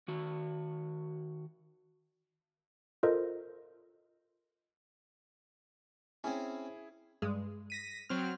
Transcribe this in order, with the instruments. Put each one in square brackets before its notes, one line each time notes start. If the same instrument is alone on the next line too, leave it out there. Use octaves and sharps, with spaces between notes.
[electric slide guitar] D#3 F#4
[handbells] F4 A4 A#4 C5 D#5
[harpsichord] C4 C#4 [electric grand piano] E4 G#4
[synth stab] G2 G#3
[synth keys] A#6 B6 D#7
F#3 C4 F6